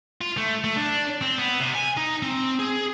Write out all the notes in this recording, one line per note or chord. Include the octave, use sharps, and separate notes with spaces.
F4
A3
A3
D4
C4
B3
C3
G#5
D#4
C4
G#4